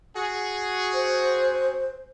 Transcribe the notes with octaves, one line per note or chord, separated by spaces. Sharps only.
F#4 G#4
C5